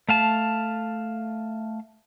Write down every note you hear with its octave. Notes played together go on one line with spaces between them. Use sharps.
A3 F5 A5